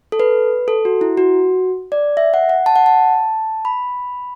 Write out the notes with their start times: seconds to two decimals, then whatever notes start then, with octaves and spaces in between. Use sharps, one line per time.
0.12 A4
0.20 B4
0.68 A4
0.85 F#4
1.01 E4
1.17 F#4
1.92 D5
2.17 E5
2.34 F#5
2.49 F#5
2.66 A5
2.76 F#5
2.86 A5
3.65 B5